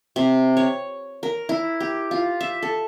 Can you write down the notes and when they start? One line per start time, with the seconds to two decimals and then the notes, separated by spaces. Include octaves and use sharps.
0.16 C3
0.57 C#5
1.23 A#4
1.49 E4
1.80 G4
2.11 F4
2.41 E5
2.62 A4